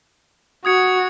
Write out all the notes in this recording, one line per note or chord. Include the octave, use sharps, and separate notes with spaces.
F#4 D#6 G#6 C#7